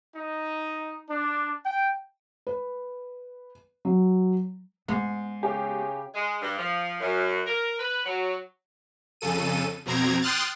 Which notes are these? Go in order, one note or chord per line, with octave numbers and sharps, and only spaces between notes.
D#4
D4
G5
B4
F#3
G#2 B3
C#3 G4
G#3
G2
F3
F#2
A#4
B4
F#3
F2 C#3 A4 D#7
F2 B2 C4 A#5 G#6
G5 C6 D#6 F6 F#6 A6